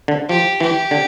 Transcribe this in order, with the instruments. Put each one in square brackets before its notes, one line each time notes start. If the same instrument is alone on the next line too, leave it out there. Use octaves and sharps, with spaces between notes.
[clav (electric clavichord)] D3
[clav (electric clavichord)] F3 [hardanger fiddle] G4
[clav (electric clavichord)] E3 [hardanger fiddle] G4
[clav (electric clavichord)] D3